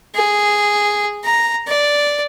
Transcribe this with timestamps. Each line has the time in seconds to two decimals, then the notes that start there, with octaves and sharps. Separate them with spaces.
0.15 G#4
1.25 A#5
1.67 D5